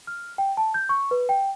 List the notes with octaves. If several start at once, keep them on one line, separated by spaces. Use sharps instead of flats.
F6
G5
A5
G6
C#6
B4
G5